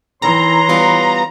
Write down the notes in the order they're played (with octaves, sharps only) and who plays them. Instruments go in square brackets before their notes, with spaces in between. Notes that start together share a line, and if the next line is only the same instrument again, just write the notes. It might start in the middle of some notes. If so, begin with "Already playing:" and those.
[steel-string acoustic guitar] E2 D#3 [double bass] E3 [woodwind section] C#5 C6 [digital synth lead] A#5
[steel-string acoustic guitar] G3 B3 F4